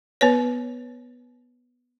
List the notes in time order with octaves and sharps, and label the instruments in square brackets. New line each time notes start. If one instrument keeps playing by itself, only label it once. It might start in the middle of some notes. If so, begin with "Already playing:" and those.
[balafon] B3 B4 C#5